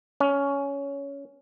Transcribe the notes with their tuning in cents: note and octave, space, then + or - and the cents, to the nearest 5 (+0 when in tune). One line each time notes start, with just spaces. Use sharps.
C#4 +15